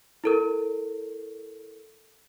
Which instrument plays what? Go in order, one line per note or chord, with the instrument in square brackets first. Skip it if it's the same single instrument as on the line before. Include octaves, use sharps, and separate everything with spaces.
[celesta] E4 A4 A#4